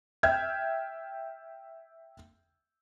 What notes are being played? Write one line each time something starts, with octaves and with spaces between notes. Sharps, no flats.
E5 G5 F6 G6 G#6